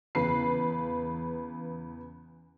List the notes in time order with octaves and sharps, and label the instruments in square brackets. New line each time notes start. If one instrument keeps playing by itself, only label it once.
[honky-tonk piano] E2 C#3 B4 C7